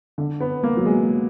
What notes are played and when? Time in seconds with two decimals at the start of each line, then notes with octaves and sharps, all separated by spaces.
0.18 D3
0.40 B3
0.63 A#3
0.77 F#3
0.85 G#3